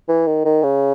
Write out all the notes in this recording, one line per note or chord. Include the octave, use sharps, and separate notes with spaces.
E3
D#3
D#3
C#3